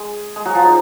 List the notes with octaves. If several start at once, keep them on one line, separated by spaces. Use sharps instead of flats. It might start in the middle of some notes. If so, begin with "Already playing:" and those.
Already playing: G#3 G#4
G#3 G#4
F#3 F#4
F3 F4
D#4